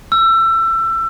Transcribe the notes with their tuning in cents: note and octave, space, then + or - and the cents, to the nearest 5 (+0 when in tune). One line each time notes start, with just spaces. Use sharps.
E6 +25